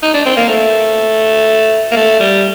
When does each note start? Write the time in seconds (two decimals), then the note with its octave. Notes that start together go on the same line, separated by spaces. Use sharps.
0.03 D#4
0.14 D4
0.26 C4
0.37 A#3
0.49 A3
1.91 A#3
1.96 A3
2.20 G3